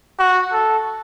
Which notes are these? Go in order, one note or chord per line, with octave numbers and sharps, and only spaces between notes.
F#4
A4